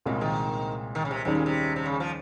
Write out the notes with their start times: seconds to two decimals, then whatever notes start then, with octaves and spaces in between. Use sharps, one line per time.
0.06 C2 A#2 C#3 G#3 C4
0.21 D#3
0.95 D#3
1.05 C#3
1.11 C3
1.25 D#2 C3 D#3 G3 C#4 G#4
1.35 A#2
1.46 C3
1.76 C3
1.86 C#3
2.00 F3